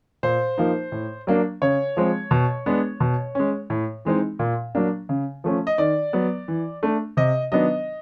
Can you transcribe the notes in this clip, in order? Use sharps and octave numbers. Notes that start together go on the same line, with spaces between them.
A#2 C5
F3 A#3 D#4
A2
F#3 A#3 D4
C#3 C#5
F3 G#3 C4
B2
G#3 B3 D4
B2
G#3 C#4
A2
E3 G#3 C4 D#4
A#2
F#3 A#3 D4
C#3
F3 A3 C#4
D#5
D#3 D5
F#3 B3
E3
A3 D4
C3 D#5
D#3 F#3 B3 D4 D#5